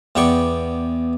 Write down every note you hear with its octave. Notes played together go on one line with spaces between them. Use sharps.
E2 B3 D5 G5 C#6